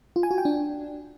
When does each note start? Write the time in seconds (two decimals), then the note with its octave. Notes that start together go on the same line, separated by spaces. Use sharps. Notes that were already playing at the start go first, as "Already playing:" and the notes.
0.16 F4
0.23 G#5
0.31 F#4
0.38 G5
0.45 D4